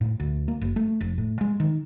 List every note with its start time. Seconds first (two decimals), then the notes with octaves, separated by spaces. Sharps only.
0.01 A2
0.20 D2
0.48 A#3
0.61 F#1
0.76 A3
1.01 F1
1.18 A2
1.41 G#3
1.60 D#3